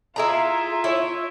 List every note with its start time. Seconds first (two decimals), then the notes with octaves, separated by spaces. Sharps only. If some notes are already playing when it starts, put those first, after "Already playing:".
0.16 E4 F4 G#4 E5 A#5
0.84 E4 C#5